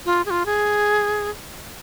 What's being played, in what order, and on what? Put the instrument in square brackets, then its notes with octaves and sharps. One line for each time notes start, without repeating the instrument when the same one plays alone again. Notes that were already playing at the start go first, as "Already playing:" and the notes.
[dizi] F4
G#4
F4
G#4